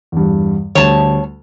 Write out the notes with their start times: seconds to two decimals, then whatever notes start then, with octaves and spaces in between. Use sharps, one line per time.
0.12 E2 G2
0.75 D2 G3 C#5 A5